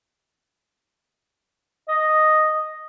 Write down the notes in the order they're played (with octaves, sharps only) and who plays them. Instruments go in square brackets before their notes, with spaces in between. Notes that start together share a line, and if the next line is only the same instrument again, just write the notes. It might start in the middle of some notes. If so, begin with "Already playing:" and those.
[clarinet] D#5